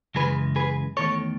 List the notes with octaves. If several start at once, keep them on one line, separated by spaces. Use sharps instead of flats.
F#2 C#3 E3 G#3 G#4 B4
G#4 B4
E2 D#3 A3 A4 C#5